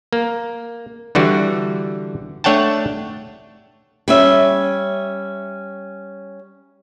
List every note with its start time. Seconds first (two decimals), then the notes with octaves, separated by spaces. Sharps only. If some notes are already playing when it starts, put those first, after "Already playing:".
0.13 A#3
1.15 D3 E3 G3 F#4
2.44 A3 D4 C#5 F#5 G5 A5
4.08 G3 C#4 E5